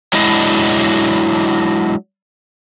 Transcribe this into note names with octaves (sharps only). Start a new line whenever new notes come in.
F#3 G#3 D4 E4 D#5